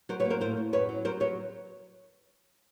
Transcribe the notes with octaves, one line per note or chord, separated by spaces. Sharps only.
F#3 A#4 C5
B4 C#5
A#3
A#4 C5
A2 A#4 C5
A2
F#2 B4 C#5
F#3
F#3 A#4 C5
F#3 B4 C#5